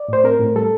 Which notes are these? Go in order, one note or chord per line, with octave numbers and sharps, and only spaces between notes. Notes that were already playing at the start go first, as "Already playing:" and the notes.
Already playing: D5
A2 C5
C4 A#4
A2
G3 A4